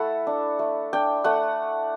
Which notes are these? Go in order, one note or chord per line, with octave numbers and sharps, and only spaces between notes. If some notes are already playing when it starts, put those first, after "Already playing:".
Already playing: A3 E4 A4 F#5
D4
A3
D4 G5
A3 F#5